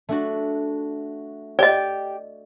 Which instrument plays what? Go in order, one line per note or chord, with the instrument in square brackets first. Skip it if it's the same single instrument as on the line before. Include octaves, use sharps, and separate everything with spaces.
[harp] A3 D4 F#4
[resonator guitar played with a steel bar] G4 [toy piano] D5 D#5